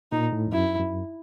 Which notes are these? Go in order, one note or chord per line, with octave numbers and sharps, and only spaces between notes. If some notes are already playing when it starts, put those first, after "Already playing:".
A#2 D#4
A2
F2
F#2 E4
F#2